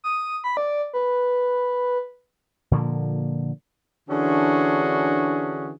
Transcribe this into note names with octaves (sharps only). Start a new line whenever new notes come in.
D#6
B5
D5
B4
A#2 D3 F3 A#3
D3 E3 C#4 D4 F#4 G#4